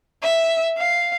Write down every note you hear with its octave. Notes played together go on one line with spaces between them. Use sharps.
E5
F5